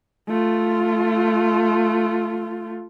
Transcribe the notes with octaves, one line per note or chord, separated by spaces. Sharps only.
A3 F4